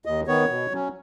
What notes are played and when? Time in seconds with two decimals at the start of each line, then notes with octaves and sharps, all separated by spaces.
0.05 D#2 D#5
0.27 D#3 B3 C#5
0.49 B2
0.71 F#3 C#4